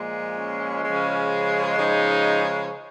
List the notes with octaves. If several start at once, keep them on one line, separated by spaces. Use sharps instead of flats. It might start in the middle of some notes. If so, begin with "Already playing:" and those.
Already playing: A#2 F3 G#3
C#4
C#3 F3 G#3
C#3 F3 G#3 D#4